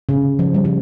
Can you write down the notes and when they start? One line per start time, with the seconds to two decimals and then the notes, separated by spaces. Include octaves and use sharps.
0.09 C#3
0.39 F3
0.54 G3
0.65 F3